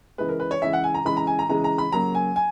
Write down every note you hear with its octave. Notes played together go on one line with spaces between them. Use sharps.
C#3 E3 G#3 B4
A#4
B4
C#5
C#3 E3 G#3 E5
F#5
G#5
A#5
C#3 E3 G#3 B5
A#5
G#5
A#5
C#3 E3 G#3 A#5
A#5
B5
C#3 F#3 A#3 A#5
G#5
G#5